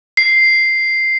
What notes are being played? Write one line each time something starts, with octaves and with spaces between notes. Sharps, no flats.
C7